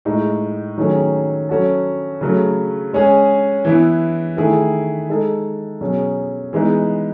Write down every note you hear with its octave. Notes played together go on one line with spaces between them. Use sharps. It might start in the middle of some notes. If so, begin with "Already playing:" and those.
A2 G#3 D#4
D#3 F#3 A3 C#4 G#4
F#3 C#4 F#4 A4
C#3 F#3 A3
G#3 C#4 G#4
E3 B3 E4
D#3 A3 E4 G#4
G#3 D#4 A4
B2 F#3 C#4 G#4
E3 G#3 B3 D#4